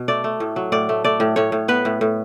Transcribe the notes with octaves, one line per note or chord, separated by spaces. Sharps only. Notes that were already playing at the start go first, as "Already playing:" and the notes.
Already playing: B2
A3 D5
A3
A2
F#3
A2 D5
A3
A3 D5
A2
A2 C#5
A2
B3 B4
A2
A2